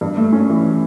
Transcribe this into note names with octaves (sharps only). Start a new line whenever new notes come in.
G2
A3
C#4
E3